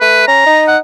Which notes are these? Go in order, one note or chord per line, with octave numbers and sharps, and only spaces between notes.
A3 B4
C#4 A#5
D#4
F#5